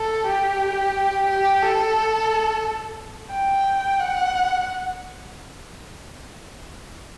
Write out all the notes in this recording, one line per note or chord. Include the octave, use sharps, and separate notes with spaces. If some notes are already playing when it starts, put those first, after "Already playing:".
Already playing: A4
G4
G4
A4
G5
F#5